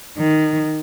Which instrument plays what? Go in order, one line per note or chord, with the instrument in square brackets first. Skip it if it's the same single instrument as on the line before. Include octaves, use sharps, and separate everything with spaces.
[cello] D#3